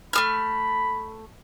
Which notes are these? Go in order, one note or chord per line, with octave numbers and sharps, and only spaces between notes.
A3 G#4 B5 F6